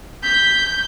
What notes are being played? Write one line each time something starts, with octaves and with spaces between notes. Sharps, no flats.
G6 B6